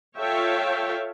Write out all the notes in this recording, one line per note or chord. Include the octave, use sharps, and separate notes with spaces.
F4 A4 C#5 E5 F5 G5